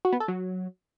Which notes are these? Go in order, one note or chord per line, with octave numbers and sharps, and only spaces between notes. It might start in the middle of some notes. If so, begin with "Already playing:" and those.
F#4
B3
A4
F#3